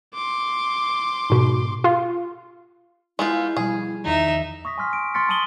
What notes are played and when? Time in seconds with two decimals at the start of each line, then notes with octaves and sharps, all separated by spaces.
0.14 C6 D6
1.30 G#2 B2
1.84 F4
3.19 G#3 B3 E4 F4 F5 E6 G6
3.57 B2 F3 G3 G#4
4.04 E2 D#3 F3 D#4 E5
4.65 C#6 D#6 A#6 B6
4.78 G#5 C6 F6 B6
4.93 D7
5.14 C6 C#6 F6 A6 B6 C#7
5.29 A5 C6 D#6 D#7 F#7 G7